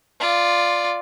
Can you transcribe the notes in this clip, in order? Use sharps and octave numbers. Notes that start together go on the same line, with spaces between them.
F4 D5